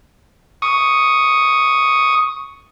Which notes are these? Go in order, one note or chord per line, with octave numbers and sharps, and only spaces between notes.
C#6 D#6